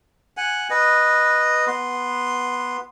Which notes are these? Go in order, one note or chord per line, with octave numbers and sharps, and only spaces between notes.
F#5 G#5
B4 D#5
B3 C6